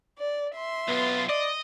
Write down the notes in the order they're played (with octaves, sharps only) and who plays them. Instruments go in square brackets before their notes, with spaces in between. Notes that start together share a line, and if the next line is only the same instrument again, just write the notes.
[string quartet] D5
E5 C6
[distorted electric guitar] B1 F4 [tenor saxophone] B3
[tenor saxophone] D5 [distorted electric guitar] D#5